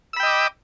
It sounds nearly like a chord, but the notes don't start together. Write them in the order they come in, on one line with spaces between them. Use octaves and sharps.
E6 B5 G5 D#5 D6